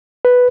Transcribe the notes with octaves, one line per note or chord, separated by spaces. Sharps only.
B4